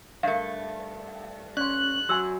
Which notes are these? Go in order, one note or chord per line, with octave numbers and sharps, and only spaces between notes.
G2 A3 A#4 E5 F5
C#4 D5 C6 F#6
F#3 F#4 G#5 C6 E6